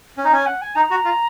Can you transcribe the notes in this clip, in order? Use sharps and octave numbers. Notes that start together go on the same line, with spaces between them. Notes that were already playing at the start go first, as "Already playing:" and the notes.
C#4
D#4
C#4 G#5
F#5
G#5
D#4 A#5
F#4
F4